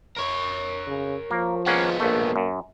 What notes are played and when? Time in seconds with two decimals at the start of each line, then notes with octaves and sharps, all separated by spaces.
0.17 A#4 C#5
0.86 C#3
1.31 F3 A#3
1.66 G#3 A#3 B3 C#4 F#5
2.00 A#1 A3 A#3
2.36 F#2